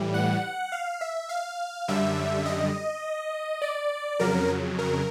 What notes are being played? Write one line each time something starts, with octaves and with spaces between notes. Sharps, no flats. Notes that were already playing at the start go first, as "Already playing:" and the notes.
Already playing: A2 E3 G3
F#5
F5
E5
F5
F#2 D3 G3 E5
D#5
D5
F2 C#3 F#3 A#4
A#4